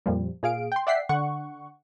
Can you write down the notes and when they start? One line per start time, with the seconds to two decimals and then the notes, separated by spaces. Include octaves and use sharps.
0.06 F2 A#2 F3 G3
0.43 A#2 G#4 F5 D7
0.72 G5 C6
0.87 D5 E5 F#5 G5 B6 C7
1.09 D3 F#5 C#6